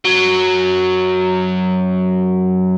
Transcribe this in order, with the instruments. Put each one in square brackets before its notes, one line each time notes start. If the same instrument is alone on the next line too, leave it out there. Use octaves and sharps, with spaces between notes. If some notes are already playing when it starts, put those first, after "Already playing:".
[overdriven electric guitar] F#2 F#3